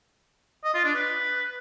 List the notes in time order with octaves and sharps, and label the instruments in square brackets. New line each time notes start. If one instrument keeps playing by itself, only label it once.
[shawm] D#5
F4
D4
B4